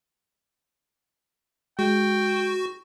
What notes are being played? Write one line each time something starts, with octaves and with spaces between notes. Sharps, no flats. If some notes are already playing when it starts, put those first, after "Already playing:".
G#3 F#4 G5